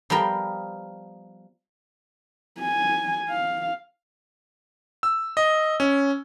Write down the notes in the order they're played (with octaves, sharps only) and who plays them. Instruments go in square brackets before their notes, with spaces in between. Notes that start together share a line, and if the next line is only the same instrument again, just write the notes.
[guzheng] F3 G3 B3 A#4 G5
[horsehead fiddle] G#5
F5
[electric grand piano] E6
D#5
C#4